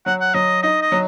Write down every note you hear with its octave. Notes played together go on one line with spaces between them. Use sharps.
F#3 F#5
F#5
F#3 D#5
D#4 D#5
D#5
F#3